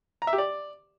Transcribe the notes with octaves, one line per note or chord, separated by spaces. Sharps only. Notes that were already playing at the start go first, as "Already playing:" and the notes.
A#5
E5
G4
D5